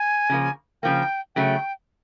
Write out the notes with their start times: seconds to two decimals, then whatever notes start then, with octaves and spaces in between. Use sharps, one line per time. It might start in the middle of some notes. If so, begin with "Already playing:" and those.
Already playing: G#5
0.30 C#3 F3 A#3
0.83 C#3 F3 A#3 G5
1.36 C#3 F#3 A3 G5